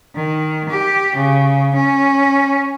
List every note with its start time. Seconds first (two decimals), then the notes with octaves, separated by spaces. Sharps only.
0.15 D#3
0.69 G4
1.16 C#3
1.75 C#4